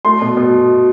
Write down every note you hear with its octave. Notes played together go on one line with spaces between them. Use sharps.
A3 C6
B2
B2